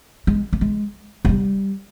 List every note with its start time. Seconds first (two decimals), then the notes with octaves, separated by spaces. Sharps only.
0.27 G#3
0.53 A3
0.61 G#3
1.25 G#3
1.29 G3